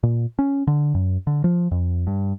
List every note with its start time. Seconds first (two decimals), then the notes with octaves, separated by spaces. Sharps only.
0.03 A#2
0.39 C#4
0.67 D3
0.95 F#2
1.27 D3
1.44 F3
1.71 F2
2.07 G2